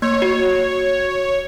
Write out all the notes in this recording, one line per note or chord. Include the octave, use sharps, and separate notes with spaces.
A#3 C#5
F#4